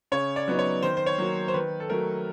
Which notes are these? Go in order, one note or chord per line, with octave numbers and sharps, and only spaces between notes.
C#3 C#5
D5
F#3 B3 D#4
C#5
D#3 C5
C5
C#5
F#3 A#3
C5
D#3 B4
A4
F#3 A3 A#4